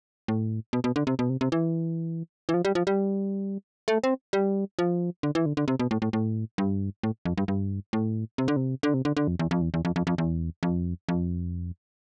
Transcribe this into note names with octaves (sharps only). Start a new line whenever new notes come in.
A2
B2
B2
D3
C3
B2
C3
C3
E3
E3
F3
G3
F3
G3
A3
C4
G3
F3
D3
E3
D3
D3
C3
B2
A2
A2
A2
G2
A2
F2
G2
G2
A2
C3
D3
C3
D3
C3
D3
D3
F2
E2
F2
E2
E2
F2
F2
F2
E2
F2
F2